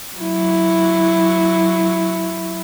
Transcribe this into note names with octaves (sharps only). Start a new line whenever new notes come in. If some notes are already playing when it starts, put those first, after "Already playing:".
F#3 E4